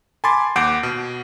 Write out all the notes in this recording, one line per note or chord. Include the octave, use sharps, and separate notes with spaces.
G#5 A5 B5 C6 D6 A6
D#2 F#5 D6 G6 C7 D7
B2